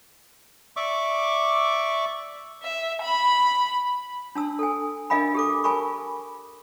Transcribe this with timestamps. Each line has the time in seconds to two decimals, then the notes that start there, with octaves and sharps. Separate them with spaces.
0.77 D5 E5 C#6 D6
2.63 E5
3.01 B5
4.35 D4 A5 E6
4.59 A4 G#5
5.10 D4 A#4 D#5 F5 G#5 B5
5.35 G4 A4 D6
5.64 A#4 G#5 A5 B5 C#6